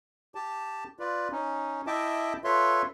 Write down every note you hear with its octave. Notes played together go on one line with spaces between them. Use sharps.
G4 A5
F4 B4 D5
C#4 D#4
E4 D#5 E5 G5 A5 D6
F4 A4 B4 C#5 E5 C6